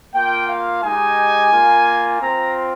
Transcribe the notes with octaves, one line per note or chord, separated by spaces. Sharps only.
A#3 F4 G5
F5
G#3 D#4 G4 G#5
A#3 F4
C4 F4 A#5